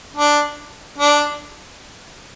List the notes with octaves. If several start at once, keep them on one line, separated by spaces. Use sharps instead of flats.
D4
D4